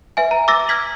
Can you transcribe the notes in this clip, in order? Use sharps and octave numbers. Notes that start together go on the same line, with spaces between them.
B4 E5 G#5
A#5
D6 E6 A6 A#6
E6 F6 G#6 B6 F#7